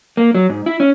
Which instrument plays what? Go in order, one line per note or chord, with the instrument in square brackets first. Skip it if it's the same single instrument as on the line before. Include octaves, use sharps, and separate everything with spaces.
[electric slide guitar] A#3
F#3
G#2
E4
C#4